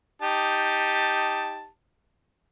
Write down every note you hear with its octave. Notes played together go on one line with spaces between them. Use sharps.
D#4 G4 A5